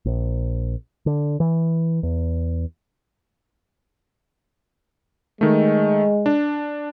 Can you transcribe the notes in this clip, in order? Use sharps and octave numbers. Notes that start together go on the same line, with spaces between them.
A#1
D3
E3
E2
D#3 G#3 A3
D4